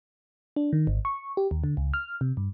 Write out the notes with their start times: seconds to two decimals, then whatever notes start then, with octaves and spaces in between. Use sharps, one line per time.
0.56 D4
0.73 D#3
0.87 G#1
1.05 C#6
1.37 G4
1.51 D#2
1.64 D3
1.77 C#2
1.94 F6
2.21 C3
2.37 G2